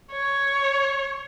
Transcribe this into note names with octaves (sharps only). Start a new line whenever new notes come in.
C#5